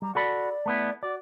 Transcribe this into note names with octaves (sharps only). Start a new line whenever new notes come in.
G3 A#5
F#4 A4 D5 B5
A3 B3 E4
F#4 D5